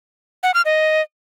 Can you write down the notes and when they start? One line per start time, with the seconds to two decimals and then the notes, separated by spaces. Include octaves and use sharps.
0.43 F#5
0.54 F6
0.65 D#5